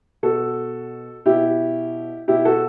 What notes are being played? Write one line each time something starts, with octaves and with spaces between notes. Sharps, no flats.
B2 F#4 A4
B2 E4 G4
B2 E4 G4
F#4 A4